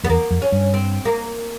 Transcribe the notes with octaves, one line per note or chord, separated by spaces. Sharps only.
F2 B3
E2 A#3
F2
C#4
G2
C4
A#3